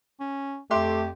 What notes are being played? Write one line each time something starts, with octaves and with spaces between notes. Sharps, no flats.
C#4
F2 A3 G4 E5 C6 D6